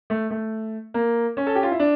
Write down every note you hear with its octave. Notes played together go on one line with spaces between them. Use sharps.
A3
A3
A#3
C#4
A4
G4
F4
E4
D4